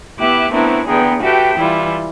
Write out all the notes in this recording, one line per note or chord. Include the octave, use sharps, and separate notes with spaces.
B3 E4 G4 E5 D6 F#6
A3 B3 C4 D4 E4 A#4
E2 D3 B3 G#4 G5 A#5
F#4 G4 A4 B4 E5 G5
E3 G3 E4 F4